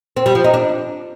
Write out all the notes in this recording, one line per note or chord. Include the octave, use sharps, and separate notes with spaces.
C4
G3
F3
D#4
D4